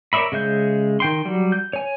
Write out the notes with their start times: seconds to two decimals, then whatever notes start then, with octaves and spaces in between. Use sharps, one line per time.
0.13 A#4 C#5 D5 E5 B5
0.32 C#3 G#3 E5 G6
1.00 D#3 G5 C6
1.25 F#3 G3
1.52 G6
1.73 C#5 G#5